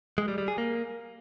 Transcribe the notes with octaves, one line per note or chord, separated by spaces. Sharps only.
G#3
G3
G3
G#4
A#3